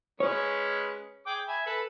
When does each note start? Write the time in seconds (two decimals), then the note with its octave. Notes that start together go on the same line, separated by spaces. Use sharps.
0.20 G#3 C#4 B4 C#5
1.27 G#4 G5 D6
1.48 E5 G#5 B5
1.66 A4 B4